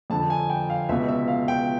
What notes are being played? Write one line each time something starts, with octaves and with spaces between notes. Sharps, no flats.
F2 D3 A5
G#5
G5
F5
C#2 B2 E5
E5
F5
G5